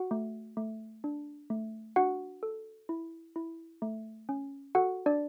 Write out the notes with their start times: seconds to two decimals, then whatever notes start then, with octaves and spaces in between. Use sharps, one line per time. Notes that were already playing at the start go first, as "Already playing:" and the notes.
Already playing: F#4 F#5
0.11 A3
0.57 A3
1.04 D4
1.50 A3
1.96 D4 F#4 F#5
2.43 A4
2.89 E4
3.36 E4
3.82 A3
4.29 C#4
4.75 F#4 A4 F#5
5.06 D4 D5